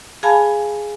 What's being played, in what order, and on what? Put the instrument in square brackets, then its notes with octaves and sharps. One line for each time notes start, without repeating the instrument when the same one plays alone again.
[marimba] G#4 F5 G#5 A5 B5